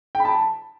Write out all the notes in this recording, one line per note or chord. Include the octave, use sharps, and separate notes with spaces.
G5
B5
A5